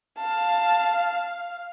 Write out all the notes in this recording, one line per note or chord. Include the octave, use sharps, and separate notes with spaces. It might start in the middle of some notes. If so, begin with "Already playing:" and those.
F5 A5